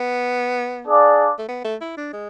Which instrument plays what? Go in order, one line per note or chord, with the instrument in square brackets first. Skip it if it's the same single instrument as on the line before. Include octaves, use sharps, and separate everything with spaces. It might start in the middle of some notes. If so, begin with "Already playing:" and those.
Already playing: [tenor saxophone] B3
[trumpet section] D4 G#4 D5 F5
[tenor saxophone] A3
B3
A3
E4
D4
G#3